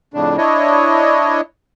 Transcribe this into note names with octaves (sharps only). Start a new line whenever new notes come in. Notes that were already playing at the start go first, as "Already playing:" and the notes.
F2 A2 C#3 D4
D4 E4 C#5 D#5